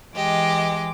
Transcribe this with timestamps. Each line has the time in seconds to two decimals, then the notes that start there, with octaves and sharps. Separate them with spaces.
0.15 E3 G#3 G4 D#5 D6